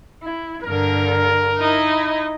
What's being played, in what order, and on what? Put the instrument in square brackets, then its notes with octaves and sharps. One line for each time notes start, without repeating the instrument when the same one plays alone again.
[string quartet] E4
[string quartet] G2 D3 [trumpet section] A#4
[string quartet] D#4 E4 D#5